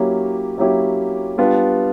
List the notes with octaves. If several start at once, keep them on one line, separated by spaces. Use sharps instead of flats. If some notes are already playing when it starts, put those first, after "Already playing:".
Already playing: F#3 A#3 C#4 E4 G4
F#3 A#3 C#4 E4 G4
G3 B3 D4 F4